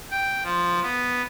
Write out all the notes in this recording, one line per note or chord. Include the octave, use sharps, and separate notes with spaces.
G5
F3
B3